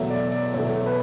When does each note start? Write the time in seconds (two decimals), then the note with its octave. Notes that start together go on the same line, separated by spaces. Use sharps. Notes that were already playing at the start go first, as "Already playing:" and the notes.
Already playing: E2 B2 F#3 A3 E5
0.10 D5
0.32 D5
0.53 E2 B2 F#3 A3 C#5
0.86 B4